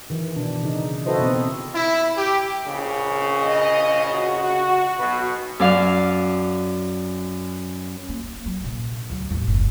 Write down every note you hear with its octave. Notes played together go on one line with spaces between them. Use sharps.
D#3 E3
B2 D4
C#3 D#4
E4 F#4 A4 B4 C5 D#5
B2 B3 C4
E4
G4
A#1 C#3
D#5
F#4
B1 B2 B4
F#2 D5 F5
A#3
F#3
A#1
D2 F#3
A1 D#2
F#1 C#2